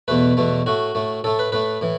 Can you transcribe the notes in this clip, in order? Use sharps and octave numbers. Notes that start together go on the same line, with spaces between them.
E2 B2 A3 B4
E2 B2 A3
A2 A3 F#4
A2 A3
A2 A3 A4
B4
A2 A3 B4
A2 E3